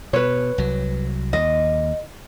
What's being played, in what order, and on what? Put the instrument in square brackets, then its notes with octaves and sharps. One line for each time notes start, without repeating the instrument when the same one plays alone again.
[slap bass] B2 [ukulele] B4 C#5
[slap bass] C2 F#3
[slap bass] D#2 [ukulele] D#5